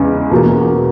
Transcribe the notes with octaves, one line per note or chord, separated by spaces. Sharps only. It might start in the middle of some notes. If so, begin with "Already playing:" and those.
Already playing: E2 C#3 G#3
E2 B2 A#3